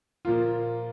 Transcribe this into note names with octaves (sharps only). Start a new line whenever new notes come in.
A#2 F3 A#3 F4